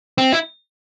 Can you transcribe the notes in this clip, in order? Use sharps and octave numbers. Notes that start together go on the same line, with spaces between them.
C4
E4